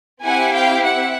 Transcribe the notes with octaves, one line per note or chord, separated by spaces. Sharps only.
C4 E4 G4 F#5 G#5
F5 G5
E5 F#5